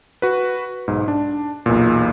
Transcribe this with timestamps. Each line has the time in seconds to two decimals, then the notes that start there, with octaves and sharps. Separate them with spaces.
0.22 F#4 B4
0.88 B1 G#2
1.08 D4
1.66 B1 E2 A#2